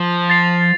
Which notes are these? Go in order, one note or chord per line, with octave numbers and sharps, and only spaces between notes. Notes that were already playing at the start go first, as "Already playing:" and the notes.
Already playing: F3
A6 C7 F7